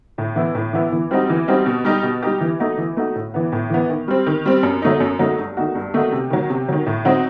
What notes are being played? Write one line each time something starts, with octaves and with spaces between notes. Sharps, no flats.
A2
E3 B3 E4
A2
E3 B3 E4
E3
G3 C4 D#4 F#4
E3
G3 C4 D#4 F#4
B2
G3 D#4 G4
B2
G3 D#4 G4
E3
A3 D#4 F#4
E3
A3 D#4 F#4
A2
E3 B3
A2
E3 B3
D#3
G3 C4
D#3
G3 C4
F#2
F#3 A3 D#4
F#2
F#3 A3 D#4
G2
D#3 A3 D#4 F#4
G2
D#3 A3 D#4 F#4
C3
D#3 F#3
C3
D#3 F#3
A2
F#3 C4 D#4 F#4